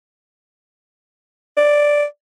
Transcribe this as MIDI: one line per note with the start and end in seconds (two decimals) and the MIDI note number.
1.57 2.04 74